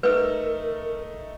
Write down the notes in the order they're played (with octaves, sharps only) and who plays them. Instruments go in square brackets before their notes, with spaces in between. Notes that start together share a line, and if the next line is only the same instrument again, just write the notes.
[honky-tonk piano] A3 D#4 E6 [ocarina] A#4 [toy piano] B4